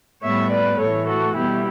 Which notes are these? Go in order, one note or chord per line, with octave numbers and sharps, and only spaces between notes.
A2 G3 B3 C#5 E5
B4 D5
A2 E3 A3 A4 C#5
F#4 A4
B2 G3 B3 E4 G4